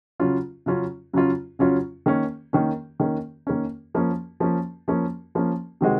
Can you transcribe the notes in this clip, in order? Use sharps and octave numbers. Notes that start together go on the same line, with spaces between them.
C#3 F#3 C#4 F4
C#3 F#3 C#4 F4
C#3 F#3 C#4 F4
C#3 F#3 C#4 F4
D#3 A#3 C#4
D#3 A#3 C#4
D#3 A#3 C#4
D#3 A#3 C#4
F3 A#3 C#4
F3 A#3 C#4
F3 A#3 C#4
F3 A#3 C#4
C3 D#3 G#3 C4 F#4